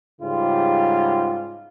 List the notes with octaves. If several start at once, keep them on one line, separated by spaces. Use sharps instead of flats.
G#2 C#3 G3 F4